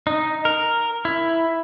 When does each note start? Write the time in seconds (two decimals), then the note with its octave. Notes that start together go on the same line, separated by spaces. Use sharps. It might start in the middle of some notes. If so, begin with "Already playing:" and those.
0.07 D#4
0.45 A#4
1.05 E4